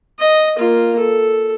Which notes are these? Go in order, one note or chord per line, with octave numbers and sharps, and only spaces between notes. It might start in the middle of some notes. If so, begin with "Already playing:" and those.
D#5
A#3 F4
A4